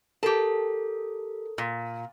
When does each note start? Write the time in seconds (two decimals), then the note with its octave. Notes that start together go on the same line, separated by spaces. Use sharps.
0.23 G4 A4 A#4 A5
1.58 A#2